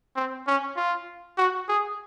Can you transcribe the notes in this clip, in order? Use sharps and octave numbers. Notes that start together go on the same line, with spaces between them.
C4
C#4
F4
F#4
G#4